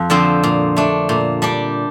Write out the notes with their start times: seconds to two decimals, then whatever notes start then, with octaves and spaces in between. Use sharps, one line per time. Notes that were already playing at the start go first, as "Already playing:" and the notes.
Already playing: F2 F4
0.10 D3 F3 C4
0.43 A#2
0.76 A3 D4
1.09 A#2
1.42 G3 D4 G4